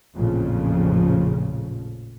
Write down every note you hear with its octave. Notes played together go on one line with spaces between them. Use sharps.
A1 F2 A#2 C#3 F3